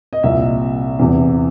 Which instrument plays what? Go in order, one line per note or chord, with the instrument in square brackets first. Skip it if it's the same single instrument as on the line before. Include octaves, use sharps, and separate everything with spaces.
[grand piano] D#5
C2 A#2 F3 E5
E2 C3 E3